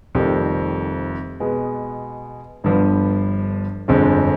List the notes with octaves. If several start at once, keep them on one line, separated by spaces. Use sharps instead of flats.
F1 F2 D#3 G3 C4
B2 G#3 B3
G1 G2 D3 F3 B3
G1 F2 D3 G#3 C4